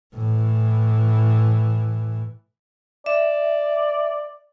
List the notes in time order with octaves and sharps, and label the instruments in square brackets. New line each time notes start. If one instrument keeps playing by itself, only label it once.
[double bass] A2 E3
[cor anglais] D5 [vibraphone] E5